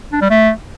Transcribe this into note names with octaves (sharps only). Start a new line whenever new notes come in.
D4
G3
A3